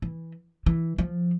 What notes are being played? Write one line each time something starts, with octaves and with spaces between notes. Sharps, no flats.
E3
E3
F3